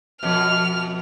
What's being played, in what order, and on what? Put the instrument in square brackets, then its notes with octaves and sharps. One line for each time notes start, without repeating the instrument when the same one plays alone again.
[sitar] F2 B2 [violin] F6